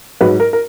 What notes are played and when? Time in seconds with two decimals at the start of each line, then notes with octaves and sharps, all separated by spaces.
0.21 G#2 F#3 B4
0.40 A#4
0.53 A#4